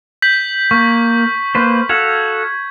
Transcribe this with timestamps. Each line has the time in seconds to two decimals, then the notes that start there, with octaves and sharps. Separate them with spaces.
0.22 G6 B6 F#7
0.71 A#3 C#6
1.55 A#3 B4 C5
1.89 F#4 A4 F5 G#6